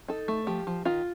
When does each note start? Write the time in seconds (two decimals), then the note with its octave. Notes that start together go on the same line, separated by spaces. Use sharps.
0.08 D#4 A4
0.28 A3
0.47 F3 G4
0.67 F3
0.85 D#3 F4